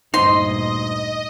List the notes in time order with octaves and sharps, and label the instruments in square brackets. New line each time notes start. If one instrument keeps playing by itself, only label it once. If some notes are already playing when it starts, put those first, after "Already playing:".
[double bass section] D2 G2 A#2 [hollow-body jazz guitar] D#4 C5 [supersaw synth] D#5 [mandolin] C6